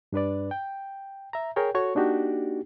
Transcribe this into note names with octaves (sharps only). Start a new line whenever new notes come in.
G2 D4 B4 D5
G5
E5 A#5
G#4 A#4 C#5 G5
F#4 A4 C#5 C#6
A#3 D4 D#4 F#4 G4